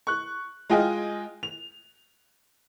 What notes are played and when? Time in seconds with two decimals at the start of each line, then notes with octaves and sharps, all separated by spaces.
0.07 C#6 F#6
0.70 G#3 F4 D#5 G5 G#5
1.43 F7